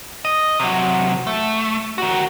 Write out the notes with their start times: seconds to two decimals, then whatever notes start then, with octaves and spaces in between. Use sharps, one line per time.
0.25 D#5
0.60 C3 F#3
1.27 A3
1.98 D#3 F#4